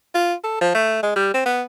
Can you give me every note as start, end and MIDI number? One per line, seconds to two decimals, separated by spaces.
0.15 0.34 65
0.44 0.60 69
0.61 0.70 53
0.75 1.01 57
1.03 1.14 56
1.16 1.29 55
1.34 1.44 60
1.46 1.63 59